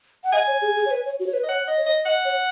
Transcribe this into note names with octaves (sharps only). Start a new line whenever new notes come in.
F#5
D#5 G#5
C#5
G#4
G#4
C#5
B4
C#5
F#4
C#5
B4
D#5
C#5 F#5
D#5
C#5
D#5
D#5 F#5
C#5